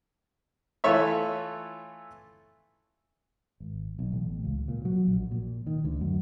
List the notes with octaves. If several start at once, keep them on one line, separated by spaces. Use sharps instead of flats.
E3 A3 F4 C#5 E5
G#1
B1
A1
C#2
A#2
F#3
A#1
A#2
D#3
D2
F#2